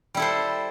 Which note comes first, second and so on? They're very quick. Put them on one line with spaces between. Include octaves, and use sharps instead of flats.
G3 E4 A4 C5